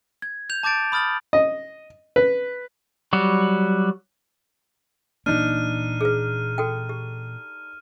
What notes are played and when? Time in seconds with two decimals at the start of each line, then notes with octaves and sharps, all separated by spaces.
0.22 G#6
0.50 G6 F7
0.63 A5 D6 G6 A6 D7
0.92 B5 D#6 F6 A6 F#7
1.33 D#5
2.16 B4
3.13 F#3 G3 F#4
5.26 A#2 E3 A#3 D4 D#4 F6 D#7
6.01 G#4 B4
6.58 F#4 A4 G5
6.89 G4